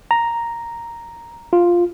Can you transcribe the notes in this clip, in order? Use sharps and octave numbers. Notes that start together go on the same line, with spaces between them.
A#5
F4